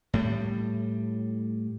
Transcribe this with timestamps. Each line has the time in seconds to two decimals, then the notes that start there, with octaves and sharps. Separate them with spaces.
0.14 A2 G3